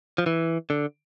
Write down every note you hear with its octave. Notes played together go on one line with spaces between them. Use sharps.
F3
E3
D3